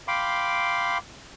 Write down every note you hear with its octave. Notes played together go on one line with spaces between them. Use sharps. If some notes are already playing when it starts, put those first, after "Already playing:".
F5 G5 B5 C6 D6